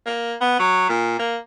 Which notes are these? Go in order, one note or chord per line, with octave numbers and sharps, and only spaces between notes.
A#3
B3
F#3
A#2
A#3